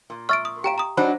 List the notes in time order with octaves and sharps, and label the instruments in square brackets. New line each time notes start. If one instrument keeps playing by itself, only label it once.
[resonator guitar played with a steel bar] A#2
[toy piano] E5 C#6 E6 [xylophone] F6 A6 D7
[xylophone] D#6
[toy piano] G4 F5 [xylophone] G5 A#5 D7
[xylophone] A#5 D#6
[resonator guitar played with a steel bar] F#3 D4 D#4 [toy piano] C5 B5